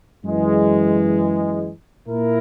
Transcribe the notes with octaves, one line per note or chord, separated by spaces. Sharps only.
F#2 E3 G#3
A#2 A#3 E4 A#4